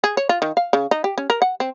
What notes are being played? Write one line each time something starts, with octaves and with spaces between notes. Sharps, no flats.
G#4
C#5
F4
D#3
F5
C#3
D#4
G4
C#4
A#4
F#5
C4